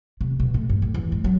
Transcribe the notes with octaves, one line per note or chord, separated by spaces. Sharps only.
C3
B2
A2
G2
A2
E2
G#3
F#3